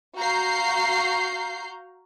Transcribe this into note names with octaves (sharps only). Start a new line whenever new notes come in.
F#4 F5 A#5 G6 C7